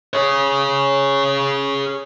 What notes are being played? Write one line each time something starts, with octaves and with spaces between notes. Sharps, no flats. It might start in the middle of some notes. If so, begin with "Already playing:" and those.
G#4 C#5